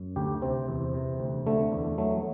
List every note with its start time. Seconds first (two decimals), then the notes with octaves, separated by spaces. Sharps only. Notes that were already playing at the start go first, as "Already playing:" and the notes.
Already playing: F#2
0.16 D2 G4
0.42 C3 C4
0.69 E2
0.94 C3
1.20 D2
1.47 D3 A3
1.72 E2
1.98 F#3 A3